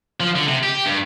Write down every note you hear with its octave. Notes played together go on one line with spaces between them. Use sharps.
F3
D3
C3
G4
G2